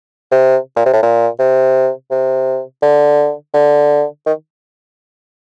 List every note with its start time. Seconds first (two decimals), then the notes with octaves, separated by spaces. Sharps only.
0.32 C3
0.76 A#2
0.86 C3
0.93 A2
1.03 A#2
1.39 C3
2.11 C3
2.82 D3
3.54 D3
4.26 D#3